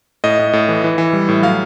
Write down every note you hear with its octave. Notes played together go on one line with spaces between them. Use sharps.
A2 D#5
A2
A2
E3
E3
E3
G3
A2
F#3 F5